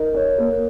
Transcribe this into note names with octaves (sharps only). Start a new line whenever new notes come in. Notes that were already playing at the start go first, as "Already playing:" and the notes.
Already playing: D#4 A#4
C#5
A#3